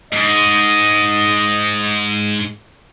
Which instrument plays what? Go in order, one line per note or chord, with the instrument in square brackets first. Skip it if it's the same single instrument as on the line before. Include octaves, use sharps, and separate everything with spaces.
[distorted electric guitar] G#2 [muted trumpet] D#5